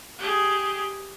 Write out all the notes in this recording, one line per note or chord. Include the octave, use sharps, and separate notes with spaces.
G4 G#4